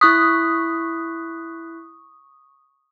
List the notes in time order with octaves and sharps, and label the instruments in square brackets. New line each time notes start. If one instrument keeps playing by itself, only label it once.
[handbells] E4 F#6 B6 [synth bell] C#6 D#6